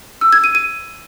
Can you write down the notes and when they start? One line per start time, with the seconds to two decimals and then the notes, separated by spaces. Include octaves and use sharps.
0.21 E6
0.33 G#6
0.44 D#7
0.55 D#7